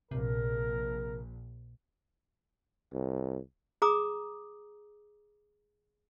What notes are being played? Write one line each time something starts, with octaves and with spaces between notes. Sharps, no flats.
A#1 C3 A#4
C2
G#4 A#5 D6 D#6